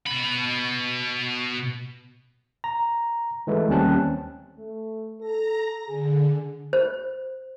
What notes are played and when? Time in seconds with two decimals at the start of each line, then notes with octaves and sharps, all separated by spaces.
0.07 B2 B5
2.64 A#5
3.47 E3 G#3 A3 B4
3.68 D#2 G3 C4 C#4 A5 F#6
4.58 A3
5.20 A4 A#5 A#6
5.87 D3 G#4
6.73 C5